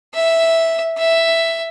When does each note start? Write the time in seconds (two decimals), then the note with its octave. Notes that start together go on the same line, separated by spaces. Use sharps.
0.14 E5
0.98 E5